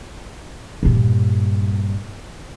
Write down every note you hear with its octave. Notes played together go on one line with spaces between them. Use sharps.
G2 A#2